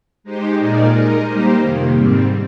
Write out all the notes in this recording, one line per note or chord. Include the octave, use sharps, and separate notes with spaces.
G#3 D#4 G4 C5
A#2 G#3 D#4 A#4 D5
G#3 D#4 A#4 D#5
G3 A#3 D#4 G4 C5
F2 C3 D#3 A#3
G#2 G3 C4